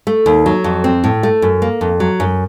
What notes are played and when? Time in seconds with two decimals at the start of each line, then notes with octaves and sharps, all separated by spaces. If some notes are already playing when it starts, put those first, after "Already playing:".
0.07 A3
0.26 D#2
0.46 F#3
0.64 F2
0.84 C4
1.04 A2
1.23 A3
1.42 F#2
1.62 A#3
1.81 F2
2.00 F#3
2.20 F#2